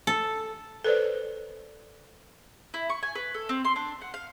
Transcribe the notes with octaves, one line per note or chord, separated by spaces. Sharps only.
A4
A4 B4 C5 D5
E4
C#6
G#5
B4
A4
C4
C6
D4
F#5
F5